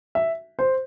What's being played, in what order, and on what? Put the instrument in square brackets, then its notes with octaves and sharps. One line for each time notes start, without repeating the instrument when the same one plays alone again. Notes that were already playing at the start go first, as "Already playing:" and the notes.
[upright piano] E5
C5